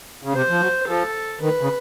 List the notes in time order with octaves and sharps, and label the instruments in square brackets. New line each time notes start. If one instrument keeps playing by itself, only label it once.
[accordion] C#3
[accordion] C3 [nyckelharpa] C5
[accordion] F3
F#3
[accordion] F3 [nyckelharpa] A4
[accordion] D#3 [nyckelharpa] B4
[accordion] C#3